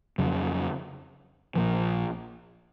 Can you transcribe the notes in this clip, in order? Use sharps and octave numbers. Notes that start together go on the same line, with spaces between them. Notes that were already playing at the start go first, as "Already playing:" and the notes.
F2 C#3 F#3
A#1 A#2 F3